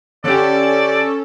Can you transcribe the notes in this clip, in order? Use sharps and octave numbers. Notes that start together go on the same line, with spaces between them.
D3 C#4 G4 A4 D5